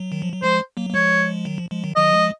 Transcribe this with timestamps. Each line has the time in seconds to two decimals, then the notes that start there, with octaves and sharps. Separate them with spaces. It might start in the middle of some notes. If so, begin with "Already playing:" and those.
Already playing: F#3
0.12 D#3
0.22 F3
0.33 F#3
0.42 F3 G#3 C5
0.77 F#3 A#3
0.90 A#3
0.93 F3 G#3 C#5
1.45 D#3 F#3
1.58 F3
1.71 F3 G#3
1.84 D#3 F#3
1.96 D#3 F#3 D#5
2.13 F3 G#3